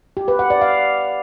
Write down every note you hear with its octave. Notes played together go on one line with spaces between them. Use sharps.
G4
B4
F#5
D5
F5